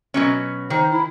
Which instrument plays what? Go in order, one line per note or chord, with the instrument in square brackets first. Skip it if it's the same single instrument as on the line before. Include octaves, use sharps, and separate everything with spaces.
[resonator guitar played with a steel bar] B2 F#3 C#4
[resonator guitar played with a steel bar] D#3 [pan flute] C5
[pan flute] E4